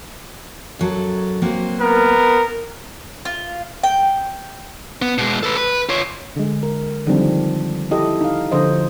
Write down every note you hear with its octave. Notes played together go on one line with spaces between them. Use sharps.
F#2 F#3 A4
F#3 A#3 C4
B3 A#4
F4
G5
B3
B2 G#3
A4 B4
B4
F4 C#5
D3 G#3
A#4
D3 D#3 F3 G3 C4 D4
E4 G4 A4 D#5
D#4 F5
D3 F3 C5 D#5